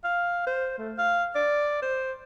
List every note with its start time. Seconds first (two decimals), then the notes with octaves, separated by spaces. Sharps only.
0.04 F5
0.46 C5
0.78 A3
0.98 F5
1.35 D5
1.82 C5